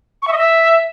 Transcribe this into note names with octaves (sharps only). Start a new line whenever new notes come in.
C#6
E5
D#5
E5